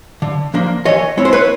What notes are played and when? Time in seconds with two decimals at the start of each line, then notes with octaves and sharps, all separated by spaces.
0.22 D3
0.54 F3 A#3 D4
0.85 E3 C#5 D#5
1.17 G#3 C4 E4 C#5
1.25 C5
1.33 B4 C#5